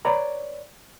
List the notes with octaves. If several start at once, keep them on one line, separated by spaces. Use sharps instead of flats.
B4 C#5 D5 A#5 B5